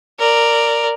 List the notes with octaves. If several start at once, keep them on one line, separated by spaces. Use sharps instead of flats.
A#4 D5